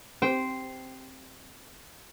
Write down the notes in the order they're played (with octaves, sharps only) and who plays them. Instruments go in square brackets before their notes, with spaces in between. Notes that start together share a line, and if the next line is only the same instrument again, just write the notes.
[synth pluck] C4 G4 [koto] C5 G5